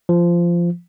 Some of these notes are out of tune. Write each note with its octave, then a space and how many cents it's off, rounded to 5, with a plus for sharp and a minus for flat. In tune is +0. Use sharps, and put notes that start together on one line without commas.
F3 -15